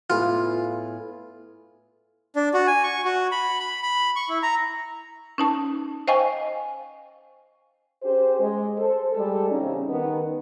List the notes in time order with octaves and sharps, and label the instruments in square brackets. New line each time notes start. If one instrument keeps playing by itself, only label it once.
[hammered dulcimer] A2 B3 G#4 [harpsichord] F4
[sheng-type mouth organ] D4
F#4
G#5
C#6
F#4
B5
B5
B5
C#6
E4
A#5
[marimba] C#4 D#4 A5
C5 D#5 F5 G5 G#5 C#6
[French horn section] C#4 G4 G#4 C5
G#3
A4 C5
G3 G#3 A4
E2 C#3 G3 C4 C#4 D#4
D#3 B3